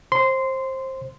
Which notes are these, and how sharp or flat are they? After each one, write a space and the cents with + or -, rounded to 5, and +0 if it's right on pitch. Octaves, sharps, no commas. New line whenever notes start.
C5 +20 C6 -15